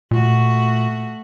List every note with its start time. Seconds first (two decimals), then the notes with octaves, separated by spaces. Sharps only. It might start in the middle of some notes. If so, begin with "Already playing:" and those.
0.11 A#2 A3 F#4